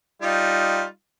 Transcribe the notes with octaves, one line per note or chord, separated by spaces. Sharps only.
G3 D#4 F4